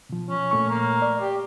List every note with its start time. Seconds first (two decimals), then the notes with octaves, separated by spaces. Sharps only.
0.09 B2 F3
0.30 C#4
0.51 A#2 A3 C#6
0.70 A#3
1.02 D5
1.21 G4